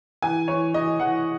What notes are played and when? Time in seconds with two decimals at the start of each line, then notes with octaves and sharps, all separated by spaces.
0.22 E3 G#5
0.48 E3 C#5
0.74 E3 D#5
0.99 E3 F#5